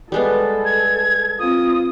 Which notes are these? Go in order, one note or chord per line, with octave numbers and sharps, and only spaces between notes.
G3 G#3 B3 A4
G#6
C4 F4 D#6